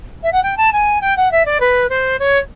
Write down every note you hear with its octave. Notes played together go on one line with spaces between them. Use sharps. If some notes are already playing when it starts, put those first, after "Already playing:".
E5
F#5
G5
A5
G#5
G5
F#5
E5
D5
B4
C5
C#5